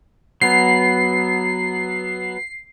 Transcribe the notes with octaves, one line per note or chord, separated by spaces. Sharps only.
F#3 B3 C7